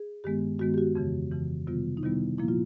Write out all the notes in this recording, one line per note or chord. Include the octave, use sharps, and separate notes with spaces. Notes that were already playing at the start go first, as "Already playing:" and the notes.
Already playing: G#4
G2 D#3 G#3 B3 G4
G2 D#3 G#3 B3 F#4
G4
F#4
F2 C#3 E3
F2 C#3 E3
C3 D#3 G3 B3 F4
D#4
C3 D#3 G3 B3 E4
A#2 F3 A#3 E4
F4